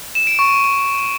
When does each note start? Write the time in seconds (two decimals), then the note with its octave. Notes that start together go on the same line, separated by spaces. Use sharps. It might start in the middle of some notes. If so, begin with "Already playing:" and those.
0.15 E7
0.27 D7
0.39 C#6